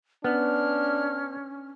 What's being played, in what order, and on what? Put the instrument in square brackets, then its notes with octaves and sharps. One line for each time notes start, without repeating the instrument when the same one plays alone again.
[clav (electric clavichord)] B3 [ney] C#4 [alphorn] D4 [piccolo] F6